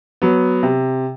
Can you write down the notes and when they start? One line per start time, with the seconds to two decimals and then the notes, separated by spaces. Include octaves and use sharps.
0.22 F#3 B3
0.63 C3